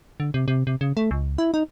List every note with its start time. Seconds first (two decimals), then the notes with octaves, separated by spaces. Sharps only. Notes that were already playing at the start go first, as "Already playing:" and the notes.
0.20 D3
0.34 C3
0.48 C3
0.67 C3
0.81 C#3
0.97 A3
1.11 C#2
1.38 E4
1.54 D#4